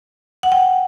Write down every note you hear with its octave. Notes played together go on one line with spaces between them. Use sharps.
F#5
G5